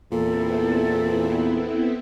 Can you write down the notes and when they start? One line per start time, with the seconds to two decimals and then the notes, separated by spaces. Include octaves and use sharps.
0.12 E2 A#2 B3 C4 E4 A4